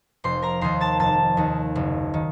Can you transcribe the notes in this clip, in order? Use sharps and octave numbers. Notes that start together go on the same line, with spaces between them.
F1 C5 C6
A#4 A#5
D#2 D#3 C5 C6
A5 A6
F1 A5 A6
D#2 D#3
F#1
D#3